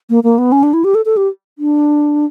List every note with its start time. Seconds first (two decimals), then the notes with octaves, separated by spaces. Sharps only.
0.10 A#3
0.24 A#3
0.38 B3
0.52 C#4
0.63 D4
0.73 E4
0.84 G4
0.95 A4
1.05 A4
1.17 G4
1.59 D4